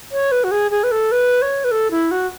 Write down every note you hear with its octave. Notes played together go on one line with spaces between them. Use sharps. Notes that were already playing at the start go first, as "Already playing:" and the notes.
C#5
B4
F#4
G#4
G#4
B4
A4
B4
C#5
B4
A4
E4
F#4